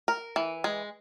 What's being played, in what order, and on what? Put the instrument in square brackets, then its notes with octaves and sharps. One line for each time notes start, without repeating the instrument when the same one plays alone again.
[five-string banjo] A#4
E3
G#3